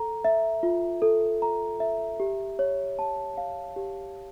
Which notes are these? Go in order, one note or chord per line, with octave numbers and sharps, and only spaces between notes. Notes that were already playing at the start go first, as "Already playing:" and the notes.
Already playing: A4 A#5
E5
F4
A4
A#5
E5
G4
C#5
A5
F5
G4